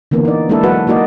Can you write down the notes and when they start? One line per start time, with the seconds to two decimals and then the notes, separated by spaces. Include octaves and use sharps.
0.11 D3 E3 A#3 B3
0.25 D#4 D5
0.49 G#3 A#3 D4 E4 A4
0.63 F#3 F#4 B4 F#5
0.87 A#3 D#4 F#4 D5 D#5